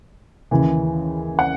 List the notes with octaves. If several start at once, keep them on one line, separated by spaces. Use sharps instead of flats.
D#2 C#3 E3
F#5